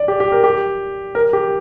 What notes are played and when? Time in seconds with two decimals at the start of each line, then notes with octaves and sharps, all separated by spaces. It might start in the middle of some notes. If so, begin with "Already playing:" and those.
Already playing: D5
0.08 G4
0.20 G4
0.32 A#4
0.44 G4
1.15 A#4
1.33 G4